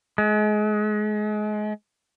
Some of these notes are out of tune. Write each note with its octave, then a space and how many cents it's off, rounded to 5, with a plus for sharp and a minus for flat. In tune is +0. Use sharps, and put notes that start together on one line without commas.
G#3 +30